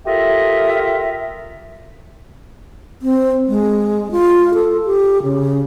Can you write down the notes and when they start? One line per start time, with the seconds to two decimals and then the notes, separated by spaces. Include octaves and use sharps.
0.06 F4 G4 A4 A#4 D#5 E5
3.02 C4
3.48 G#3
4.11 F4
4.54 A4
4.85 G4
5.23 C#3